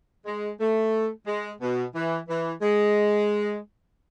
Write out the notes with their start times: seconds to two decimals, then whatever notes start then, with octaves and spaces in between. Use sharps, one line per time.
0.25 G#3
0.60 A3
1.26 G#3
1.61 B2
1.94 E3
2.28 E3
2.61 G#3